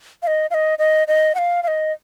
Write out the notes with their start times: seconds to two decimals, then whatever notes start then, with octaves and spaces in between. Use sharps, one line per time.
0.23 F5
0.27 D#5
0.51 F5
0.54 D#5
0.79 D#5
1.08 D#5
1.35 F#5
1.38 F5
1.63 F5
1.68 D#5